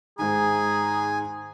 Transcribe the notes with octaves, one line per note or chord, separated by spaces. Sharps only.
G#2 D#3 G#4 G#5 A#5